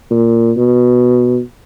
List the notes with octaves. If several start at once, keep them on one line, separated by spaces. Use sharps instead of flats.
A#2
B2